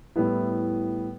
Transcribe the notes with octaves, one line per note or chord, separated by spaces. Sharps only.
A2 G3 B3 E4